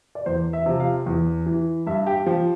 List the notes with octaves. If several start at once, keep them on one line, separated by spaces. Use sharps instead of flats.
D5
E2 C5
E5
C3 F3
F5
E2
E3
G2 E5
G4
F3 G4